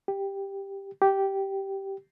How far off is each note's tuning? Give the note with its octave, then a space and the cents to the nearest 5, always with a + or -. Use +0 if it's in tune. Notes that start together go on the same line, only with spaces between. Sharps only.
G4 +5
G4 -10